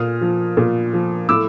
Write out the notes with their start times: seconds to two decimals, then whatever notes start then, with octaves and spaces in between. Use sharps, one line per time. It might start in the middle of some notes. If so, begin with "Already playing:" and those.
Already playing: A#2 D#6 F6
0.21 F3
0.57 A#2
0.93 F3
1.29 A2 D6 E6